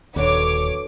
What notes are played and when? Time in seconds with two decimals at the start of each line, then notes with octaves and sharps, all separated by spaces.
0.16 D#1 D#2 D3 E3 F#3 C#5 D6